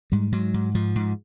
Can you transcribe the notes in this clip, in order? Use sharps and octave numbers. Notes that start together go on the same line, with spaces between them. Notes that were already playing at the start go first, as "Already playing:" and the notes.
G#2 G3
G#2 F#3
G#2
G#2 F3
G#2